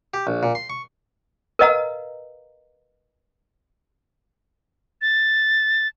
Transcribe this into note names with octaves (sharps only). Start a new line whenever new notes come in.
G4
A#1
A#2
C6
C#6
A#4 B4 D#5 F5 A#5
A6